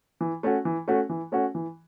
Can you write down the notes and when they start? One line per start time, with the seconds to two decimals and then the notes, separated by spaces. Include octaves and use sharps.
0.21 E3
0.43 A3 C#4 F#4
0.65 E3
0.88 A3 C#4 F#4
1.09 E3
1.32 A3 C#4 F#4
1.55 E3